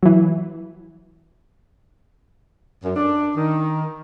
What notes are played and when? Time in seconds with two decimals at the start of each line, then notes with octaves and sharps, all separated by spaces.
0.03 E3 F#3
2.83 F#2
2.96 D4
3.36 D#3